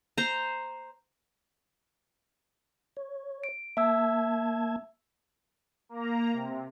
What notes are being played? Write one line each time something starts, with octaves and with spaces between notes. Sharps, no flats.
C5 A#5
C#5
D7
A#3 E5 A5 E6 G#6
A#3 A#5
C3